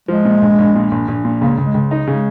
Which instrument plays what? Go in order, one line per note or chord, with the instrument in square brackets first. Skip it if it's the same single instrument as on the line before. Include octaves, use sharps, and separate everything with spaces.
[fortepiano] F3 [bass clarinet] G#3
[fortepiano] A#2
A#1
A#1
A#2
A#1
A#1
A#2
[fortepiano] C#2 [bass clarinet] A#3
[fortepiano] C#2
[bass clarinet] G#3
[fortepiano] C#2
D#4
[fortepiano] C#3 [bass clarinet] G#3